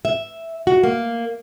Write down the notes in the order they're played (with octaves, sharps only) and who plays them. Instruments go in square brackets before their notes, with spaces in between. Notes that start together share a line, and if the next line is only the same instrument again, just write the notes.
[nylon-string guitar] E5
F#4
A#3